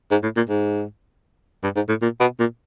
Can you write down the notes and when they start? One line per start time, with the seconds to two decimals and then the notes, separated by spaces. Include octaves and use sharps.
0.11 G#2
0.23 A2
0.37 A#2
0.49 G#2
1.63 G2
1.76 G#2
1.89 A2
2.02 A#2
2.20 B2
2.39 A#2